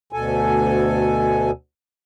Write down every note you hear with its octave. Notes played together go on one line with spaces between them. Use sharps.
D2 B2 A4 G#5